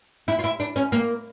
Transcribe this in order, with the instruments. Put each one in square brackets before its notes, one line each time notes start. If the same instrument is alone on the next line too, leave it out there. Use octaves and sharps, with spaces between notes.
[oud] E4
F4
E4
D4
C#4
A#3